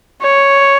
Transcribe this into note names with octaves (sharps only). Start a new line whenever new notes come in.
C#5